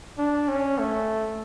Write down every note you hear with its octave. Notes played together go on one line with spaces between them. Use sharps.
D4
C#4
A3